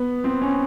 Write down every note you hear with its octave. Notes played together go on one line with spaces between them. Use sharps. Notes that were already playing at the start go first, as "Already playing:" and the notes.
Already playing: B3
C4
C#4